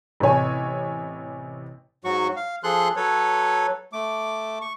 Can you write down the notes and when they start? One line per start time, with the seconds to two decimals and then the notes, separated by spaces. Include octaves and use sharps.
0.20 A1 C3 C#5 G#5
2.04 G#2 F#3 F#4 C#6
2.36 F5
2.64 F3 G#4 A4 C6 F#6
2.96 F#3 A4 B4 C#5
3.93 A3 D6
4.61 C#6